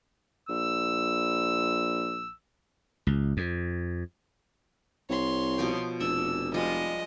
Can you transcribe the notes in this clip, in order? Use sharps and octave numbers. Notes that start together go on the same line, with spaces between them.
A#1 E6
C#2
F2
C2 C#5 C6
B2 F3 G5
F1 D4 E6
F3 G3 G#3 F4 D#5